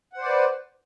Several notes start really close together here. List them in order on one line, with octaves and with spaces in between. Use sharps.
F#5 C5 D5 B4